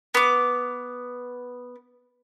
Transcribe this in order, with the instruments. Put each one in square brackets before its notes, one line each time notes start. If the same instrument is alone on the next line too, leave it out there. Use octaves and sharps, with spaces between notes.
[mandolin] B3 D6